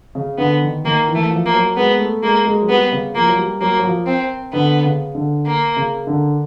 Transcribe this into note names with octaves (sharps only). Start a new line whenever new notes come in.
C#3
D3 B3
D#3
D#3 A#3
E3
A3
F3
A#3
F#3
G#3 B3
A3
G#3 A#3
G#3
F#3
G3 B3
C#3
F3 A#3
F#3
G3
F#3 A#3
F#3
F3
C4
D3 B3
C#3
D3
A#3
C#3
D3